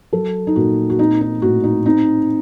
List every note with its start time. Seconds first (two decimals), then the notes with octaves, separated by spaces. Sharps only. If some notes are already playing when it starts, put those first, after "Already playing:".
0.13 F#3 A4
0.47 D#4
0.56 A#2 F#4
0.90 F#4
0.99 C4 D#4
1.21 D#4
1.42 A2 F#4
1.64 D#4
1.85 C4 D#4